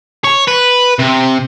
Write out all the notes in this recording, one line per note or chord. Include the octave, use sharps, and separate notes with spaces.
C#5
B4
C3